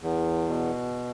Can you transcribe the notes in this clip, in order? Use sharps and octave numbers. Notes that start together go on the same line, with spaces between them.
E2
B2